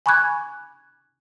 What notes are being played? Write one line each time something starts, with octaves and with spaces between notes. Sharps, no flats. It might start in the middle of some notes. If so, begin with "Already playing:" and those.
G#5 B5 C#6 D6 F#6 G#6